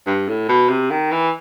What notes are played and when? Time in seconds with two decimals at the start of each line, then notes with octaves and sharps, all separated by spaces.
0.07 G2
0.28 A2
0.49 B2
0.69 C3
0.90 D#3
1.11 E3